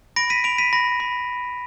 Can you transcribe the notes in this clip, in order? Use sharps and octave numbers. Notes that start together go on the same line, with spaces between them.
B5 A#6 D7
B6 D#7
B5 D7 F7
B6 D#7
B5 A#6
B5